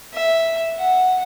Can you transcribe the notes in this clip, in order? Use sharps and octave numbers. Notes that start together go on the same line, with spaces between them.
E5
F#5